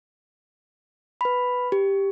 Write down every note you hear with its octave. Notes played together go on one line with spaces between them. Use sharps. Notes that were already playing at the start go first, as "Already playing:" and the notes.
B4 B5
G4